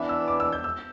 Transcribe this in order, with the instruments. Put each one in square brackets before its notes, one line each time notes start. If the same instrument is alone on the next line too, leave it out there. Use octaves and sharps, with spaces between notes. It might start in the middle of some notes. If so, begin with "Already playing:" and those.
Already playing: [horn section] E3 B3 D4 [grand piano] E5
[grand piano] E6
D6
E6
G6
E6